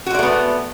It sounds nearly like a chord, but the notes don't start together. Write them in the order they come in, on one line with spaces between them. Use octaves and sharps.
F#4 G#3 D5 A3 B3